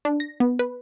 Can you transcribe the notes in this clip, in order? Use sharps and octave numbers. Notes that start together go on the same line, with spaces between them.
D4
A#6
B3
B4